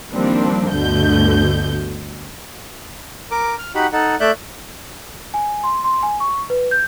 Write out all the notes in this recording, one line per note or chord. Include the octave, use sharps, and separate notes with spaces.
D#3 F3 G3 A#3 C4 D4
G1 D2 B2 D3 A3 G6
A#4 D6
F6
D#4 F#4 G4 F#5 B5
D#4 A4 F#5
A3 D5 E5 F#6 G6
G#5
C6
C6
G#5
C#6
B4
G6